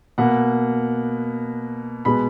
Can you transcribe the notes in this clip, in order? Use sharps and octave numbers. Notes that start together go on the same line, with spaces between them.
B2 A#3 F#5
B2 G#3 B3 B5